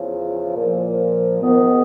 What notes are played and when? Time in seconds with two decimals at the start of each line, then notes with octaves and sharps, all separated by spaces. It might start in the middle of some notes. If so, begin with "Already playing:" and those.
Already playing: E2 C#3 F3
0.57 A#2 F3
1.42 G#2 D#3 B3